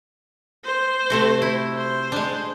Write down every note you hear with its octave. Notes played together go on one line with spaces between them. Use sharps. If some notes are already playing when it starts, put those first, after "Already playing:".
C5
C3 A3 F#4
E4
C5
G#3 D4